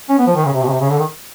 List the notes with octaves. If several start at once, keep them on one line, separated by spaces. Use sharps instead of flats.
C#4
B3
F3
D#3
C#3
C3
B2
C#3
C3
C#3
D3
D#3